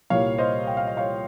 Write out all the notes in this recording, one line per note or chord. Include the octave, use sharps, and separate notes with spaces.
C2 A#2 G3 A#3 C#5 F5
C5 D#5
G5
F5
D#5
C#5 F5